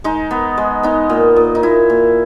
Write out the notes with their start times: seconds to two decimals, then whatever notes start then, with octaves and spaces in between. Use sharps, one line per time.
0.04 G#3 D#4
0.31 B3
0.57 G#3
0.83 B3 D#4
1.10 A#2
1.36 A#2
1.55 D#4
1.63 A#2 E4
1.90 A#2